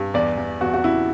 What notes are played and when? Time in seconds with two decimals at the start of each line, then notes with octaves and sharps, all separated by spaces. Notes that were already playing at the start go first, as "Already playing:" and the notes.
Already playing: G2
0.14 E2 D5
0.38 E2
0.61 E2 F#4
0.74 F#4
0.84 C#3 E4